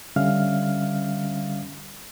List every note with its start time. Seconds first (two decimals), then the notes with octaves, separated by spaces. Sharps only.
0.16 D3 G3 C#4 E5 F5 F6